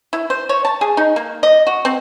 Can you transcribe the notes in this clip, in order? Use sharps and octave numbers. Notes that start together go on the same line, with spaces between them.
E4
C5
C#5
A5
G#4
D#4
A#3
D#5
F#4
C4